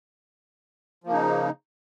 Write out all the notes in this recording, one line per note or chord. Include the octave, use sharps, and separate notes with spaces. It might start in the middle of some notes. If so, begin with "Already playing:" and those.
C#3 F3 A#3 D#4